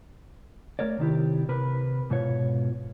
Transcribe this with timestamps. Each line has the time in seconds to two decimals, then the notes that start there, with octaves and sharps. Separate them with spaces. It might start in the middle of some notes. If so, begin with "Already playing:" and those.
0.79 A3 A#4 C#5 D5
0.99 C3 D#3 E4 G4
1.49 C3 A#4 B4
2.10 G#2 B2 F4 C#5